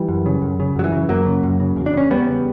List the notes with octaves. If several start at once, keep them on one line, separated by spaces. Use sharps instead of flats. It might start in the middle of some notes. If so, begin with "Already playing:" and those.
Already playing: E3 G3
F#2
C#3
F#2
C#3
F#2 F#3
E3
C#3
F#2 F#3 A#3
C#3
F#2
C#3
E2
D4
C#3 C#4
E2 G3 B3
C#3